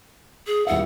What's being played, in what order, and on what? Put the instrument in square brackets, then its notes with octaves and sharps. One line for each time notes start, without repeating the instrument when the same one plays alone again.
[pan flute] G#4
[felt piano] D#1 E4 E5 [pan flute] F#5